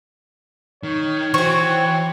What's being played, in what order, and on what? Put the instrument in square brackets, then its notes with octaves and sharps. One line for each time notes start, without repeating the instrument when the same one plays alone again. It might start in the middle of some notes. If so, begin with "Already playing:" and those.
[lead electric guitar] D#3 [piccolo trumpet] C#5
[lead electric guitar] E3 [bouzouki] C4 F#4 [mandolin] C#6